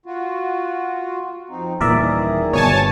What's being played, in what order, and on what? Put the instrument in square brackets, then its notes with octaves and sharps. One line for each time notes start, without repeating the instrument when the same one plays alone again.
[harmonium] F4 F#4
F2 C4 D#4
[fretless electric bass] D#1 A#2 E3 [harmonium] D#3 G#4 [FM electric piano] A#4 D5 E5
[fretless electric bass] G1 B2 [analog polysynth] C#5 G#5 A5